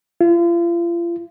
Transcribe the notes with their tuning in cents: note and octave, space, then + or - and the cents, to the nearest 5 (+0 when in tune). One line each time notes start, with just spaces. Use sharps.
F4 -40